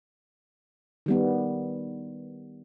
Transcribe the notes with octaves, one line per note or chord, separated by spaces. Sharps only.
D#3 G3 B3